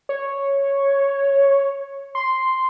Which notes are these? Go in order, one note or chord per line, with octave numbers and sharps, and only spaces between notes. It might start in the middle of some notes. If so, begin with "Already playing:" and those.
C#5
C6